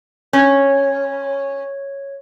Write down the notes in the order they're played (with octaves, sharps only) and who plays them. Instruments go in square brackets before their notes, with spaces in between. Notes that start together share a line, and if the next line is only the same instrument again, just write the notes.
[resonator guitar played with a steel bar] C#4 [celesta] C#5 G#6